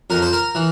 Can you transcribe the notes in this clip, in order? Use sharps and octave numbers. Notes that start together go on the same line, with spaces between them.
F2 A#4
C5
A#4
E3